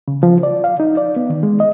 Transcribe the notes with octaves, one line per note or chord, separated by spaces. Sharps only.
C#3
F3
D5
F5
D#4
D5
B3
D#3
G#3
D#5